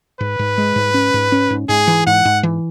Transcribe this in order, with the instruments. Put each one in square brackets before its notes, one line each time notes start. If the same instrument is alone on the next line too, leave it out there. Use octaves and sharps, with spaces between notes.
[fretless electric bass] G#2 [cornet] B4
[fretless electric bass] G#2
G#3
G#2
C#4
G#2
C#4
G#2
[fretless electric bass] G#2 [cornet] G#4
[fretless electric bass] E3
[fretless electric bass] G#2 [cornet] F#5
[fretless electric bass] G#2
E3